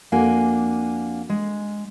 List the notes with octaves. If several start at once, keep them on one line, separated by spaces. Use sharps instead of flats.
F2 A#3 D4 F#4 G#5
G#3